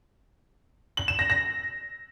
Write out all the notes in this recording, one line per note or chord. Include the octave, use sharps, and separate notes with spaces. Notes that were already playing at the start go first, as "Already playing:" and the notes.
F#7
E7
A#6
A#6